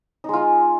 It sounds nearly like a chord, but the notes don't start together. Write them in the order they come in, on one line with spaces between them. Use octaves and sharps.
D#4 G#3 F4